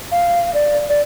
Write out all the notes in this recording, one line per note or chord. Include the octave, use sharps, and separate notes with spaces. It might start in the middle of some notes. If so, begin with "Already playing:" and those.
F5
D5
D5